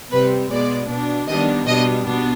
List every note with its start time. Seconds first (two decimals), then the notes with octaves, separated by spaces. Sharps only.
0.11 C3 G3 C4 B4
0.50 B2 G#3 B3 D5
0.88 B2 B3 D4
1.27 D#3 G3 B3 D4 D#5
1.66 B2 G3 B3 D4 D#5
2.05 B2 B3 D4